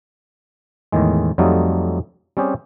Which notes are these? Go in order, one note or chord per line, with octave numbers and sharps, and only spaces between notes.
E2 A2 D#3 G#3
F2 F#3 G3 A3 D#4 F4
G3 C4 C#4 G4 G#4